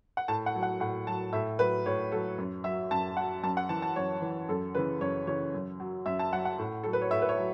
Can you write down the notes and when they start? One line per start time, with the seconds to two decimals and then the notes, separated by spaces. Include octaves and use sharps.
0.17 F#5
0.28 A2 A5
0.46 F#5
0.55 F#3
0.63 F#5
0.80 A2 F#5
1.07 F#3 A5
1.33 A2 E5
1.59 F#3 B4
1.86 A2 C#5
2.12 F#3 A4
2.38 F#2
2.64 F#3 E5
2.91 F#2 A5
3.17 F#3 F#5
3.43 F#2 A5
3.57 F#5
3.69 E3 A5
3.82 A5
3.96 F#2 C#5
4.22 E3
4.49 F#2 A4
4.75 C#3 E3 B4
5.01 F#2 C#5
5.27 C#3 E3 C#5
5.54 F#2
5.80 F#3
6.06 F#2 E5
6.19 A5
6.33 F#3 F#5
6.45 F#5
6.59 A2
6.84 F#3 A4
6.93 B4
7.02 C#5
7.11 A2 E5
7.22 B4
7.29 C#5
7.38 F#3